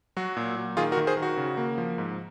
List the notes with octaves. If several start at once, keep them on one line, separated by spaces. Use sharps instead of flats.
F#3 F#4
A#2
A#2
D#3 F4 G#4
F#4 A#4
D#3
G#4 C5
D#3
F#4
C#3
A#3
F3
G#2